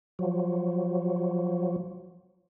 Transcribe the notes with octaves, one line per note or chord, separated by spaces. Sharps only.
F3 F#3